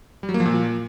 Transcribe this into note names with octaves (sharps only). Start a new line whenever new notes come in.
G3
F#3
A#3
F3
A#2